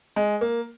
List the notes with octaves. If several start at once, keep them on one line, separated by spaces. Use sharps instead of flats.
G#3
A#3